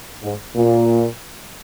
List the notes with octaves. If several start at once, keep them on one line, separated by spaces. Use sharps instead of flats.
G#2
A#2